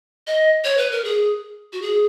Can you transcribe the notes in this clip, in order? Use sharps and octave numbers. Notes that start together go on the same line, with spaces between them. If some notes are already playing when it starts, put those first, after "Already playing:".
D#5
C#5
B4
A#4
G#4
F#4
G#4